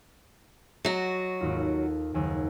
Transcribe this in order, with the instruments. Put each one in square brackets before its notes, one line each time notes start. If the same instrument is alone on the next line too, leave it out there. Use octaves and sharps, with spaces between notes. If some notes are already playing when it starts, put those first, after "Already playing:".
[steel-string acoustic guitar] F#3 F#4 [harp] D#5
[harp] G#1 D#2 F4
A4
F#1 D#2 G#5